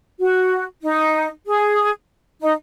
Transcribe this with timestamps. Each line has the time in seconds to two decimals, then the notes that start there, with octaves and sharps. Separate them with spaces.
0.19 F#4
0.82 D#4
1.46 G#4
2.41 D#4